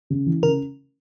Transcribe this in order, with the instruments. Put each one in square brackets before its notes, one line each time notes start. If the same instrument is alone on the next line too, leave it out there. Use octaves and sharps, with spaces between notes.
[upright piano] C#3
E3
[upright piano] C#3 [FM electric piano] A#4